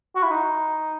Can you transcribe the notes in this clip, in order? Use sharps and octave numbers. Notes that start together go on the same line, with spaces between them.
F#4
E4
D#4